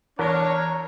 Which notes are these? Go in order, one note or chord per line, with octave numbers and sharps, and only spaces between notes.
E2 D4 A#4 C#5